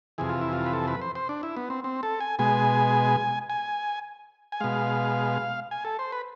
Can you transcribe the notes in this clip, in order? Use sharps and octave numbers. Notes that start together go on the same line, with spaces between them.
F2 C3 E3 G#4
F4
E4
F4
B4
A4
B4
C5
C5
D4
E4
B3
C4
C4
A4
G#5
B2 G#3 G#5
G#5
G#5
B2 G#3 F5
G#5
A4
C5
B4